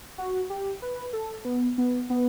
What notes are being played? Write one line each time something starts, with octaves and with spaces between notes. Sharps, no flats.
F#4
G4
B4
A4
B3
B3
B3